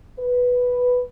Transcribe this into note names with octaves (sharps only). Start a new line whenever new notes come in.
B4